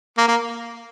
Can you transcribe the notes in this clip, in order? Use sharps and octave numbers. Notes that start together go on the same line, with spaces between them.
A#3
A#3